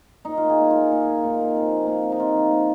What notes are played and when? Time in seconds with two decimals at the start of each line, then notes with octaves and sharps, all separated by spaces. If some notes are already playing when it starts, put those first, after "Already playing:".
0.25 A#2 D#4
0.37 F4
0.44 A#3
0.49 G#4
0.60 A#2
0.71 F4
0.76 A#3
0.91 A#2 G#4
1.07 A#3
1.24 A#2 D#4
1.39 A#3
1.56 C3
1.71 F3
1.87 A#3
2.03 C3
2.12 D#4
2.19 C3 F4
2.35 F3
2.51 A#3